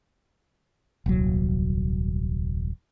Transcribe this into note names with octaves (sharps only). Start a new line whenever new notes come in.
D#1 C2 F#3